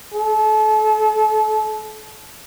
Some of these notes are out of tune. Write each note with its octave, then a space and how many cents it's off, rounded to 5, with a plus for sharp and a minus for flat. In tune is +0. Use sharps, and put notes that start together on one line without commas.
A4 -35